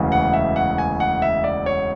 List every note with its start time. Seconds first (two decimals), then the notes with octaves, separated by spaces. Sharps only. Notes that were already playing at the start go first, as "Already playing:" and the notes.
Already playing: E1 D2 C#3 E3
0.12 F#5
0.33 E5
0.56 F#5
0.78 G#5
1.00 F#5
1.22 E5
1.44 D5
1.66 C#5